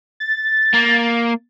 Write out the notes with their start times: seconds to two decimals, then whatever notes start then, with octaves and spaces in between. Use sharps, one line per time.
0.20 A6
0.73 A#3